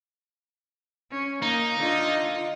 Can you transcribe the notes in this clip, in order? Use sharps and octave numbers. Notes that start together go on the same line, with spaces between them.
C#4
A#3 D#4
D3 F4 D#5